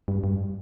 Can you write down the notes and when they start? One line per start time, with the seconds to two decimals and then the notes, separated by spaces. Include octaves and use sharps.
0.08 G2
0.24 G2